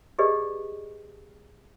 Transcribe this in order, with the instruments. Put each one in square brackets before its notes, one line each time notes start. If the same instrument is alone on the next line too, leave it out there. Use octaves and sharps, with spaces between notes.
[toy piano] G4 G#4 B4 D5 D#5